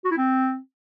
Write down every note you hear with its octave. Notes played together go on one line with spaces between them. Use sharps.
F#4
E4
C4